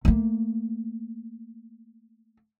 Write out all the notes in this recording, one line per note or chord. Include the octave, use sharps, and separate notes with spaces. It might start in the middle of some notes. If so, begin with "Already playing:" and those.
A3 A#3